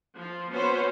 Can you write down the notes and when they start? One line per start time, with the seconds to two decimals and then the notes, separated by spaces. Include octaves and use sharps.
0.16 F3
0.53 B3 C#4 F#4 B4 C5